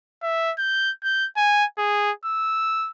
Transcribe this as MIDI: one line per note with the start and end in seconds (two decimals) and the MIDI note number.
0.23 0.53 76
0.58 0.91 91
1.04 1.27 91
1.37 1.65 80
1.78 2.11 68
2.25 2.91 88